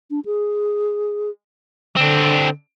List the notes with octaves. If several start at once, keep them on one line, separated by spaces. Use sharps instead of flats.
D4
G#4
D3 C4 D4